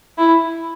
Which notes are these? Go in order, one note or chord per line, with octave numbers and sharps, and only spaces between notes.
E4